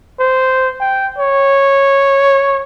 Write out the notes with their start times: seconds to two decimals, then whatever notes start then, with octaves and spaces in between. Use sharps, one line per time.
0.20 C5
0.80 G5
1.18 C#5